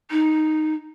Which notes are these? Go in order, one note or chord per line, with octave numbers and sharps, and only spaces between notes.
D#4